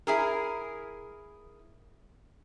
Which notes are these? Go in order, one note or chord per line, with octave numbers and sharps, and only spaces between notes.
E4 G#4 A#4